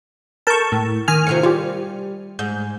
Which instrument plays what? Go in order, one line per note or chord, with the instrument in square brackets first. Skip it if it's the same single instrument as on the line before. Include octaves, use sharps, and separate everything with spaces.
[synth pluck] A4 A#4 G6 [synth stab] A5 C#6
[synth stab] A2
D#3 G#5 F6
[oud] A2 C3 F3 [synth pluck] C#7
[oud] G3 [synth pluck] F4 G4
[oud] G#2 [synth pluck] G6